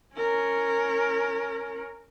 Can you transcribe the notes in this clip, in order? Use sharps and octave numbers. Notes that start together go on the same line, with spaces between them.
C#4 A#4